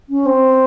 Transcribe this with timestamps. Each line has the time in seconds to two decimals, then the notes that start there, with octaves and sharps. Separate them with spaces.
0.09 C#4
0.26 C4